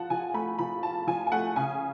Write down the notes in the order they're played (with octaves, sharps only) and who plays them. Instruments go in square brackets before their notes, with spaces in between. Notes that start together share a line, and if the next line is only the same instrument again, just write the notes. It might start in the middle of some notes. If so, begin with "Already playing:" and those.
Already playing: [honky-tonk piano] F3 F4 F#5 A5
F3 G#5
A3 B5
F3 B5
F4 A5
F3 G#5
G#5
A3 F#5
C#3 G#5